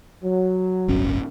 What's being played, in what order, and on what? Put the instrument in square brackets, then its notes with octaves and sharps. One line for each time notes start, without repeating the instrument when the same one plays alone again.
[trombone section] F#3
[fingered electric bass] D1 G1 C#4